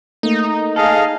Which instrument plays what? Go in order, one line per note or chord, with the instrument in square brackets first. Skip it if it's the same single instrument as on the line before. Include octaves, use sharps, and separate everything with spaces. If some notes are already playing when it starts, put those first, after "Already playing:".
[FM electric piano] A3 A#3 [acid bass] D#4
[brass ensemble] G#4 D#5 F5 [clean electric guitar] A4